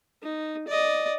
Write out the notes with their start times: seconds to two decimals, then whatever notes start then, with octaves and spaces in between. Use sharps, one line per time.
0.22 D#4
0.68 D5 D#5